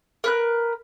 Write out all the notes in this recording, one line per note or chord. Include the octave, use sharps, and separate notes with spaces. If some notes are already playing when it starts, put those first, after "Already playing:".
A#4 B4 F#6